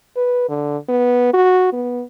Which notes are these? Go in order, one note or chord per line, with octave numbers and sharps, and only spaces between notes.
B4
D3
B3
F#4
B3